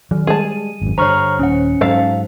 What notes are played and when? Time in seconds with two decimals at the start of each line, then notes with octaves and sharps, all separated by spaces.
0.11 D#3 F#3
0.27 G3 G#3 G#4 A5 D#7
0.82 G#1 F#2
0.98 G2 D3 C5 C#5 A#5 C#6 F6
1.39 D#1 C#4 F#5
1.81 G#2 F#3 A4 C5 F5